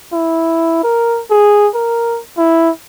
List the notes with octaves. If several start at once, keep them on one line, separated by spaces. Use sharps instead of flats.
E4
A#4
G#4
A#4
E4